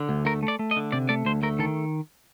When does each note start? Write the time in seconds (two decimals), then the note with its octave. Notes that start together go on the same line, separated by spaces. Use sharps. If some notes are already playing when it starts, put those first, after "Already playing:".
Already playing: D3
0.09 D2
0.26 A3 A#4
0.43 A3
0.48 D5
0.59 A3
0.71 D#5
0.76 D3
0.92 C3 D5
1.09 A3 D5
1.25 D2 C5
1.43 A3 A#4
1.59 D#3 A4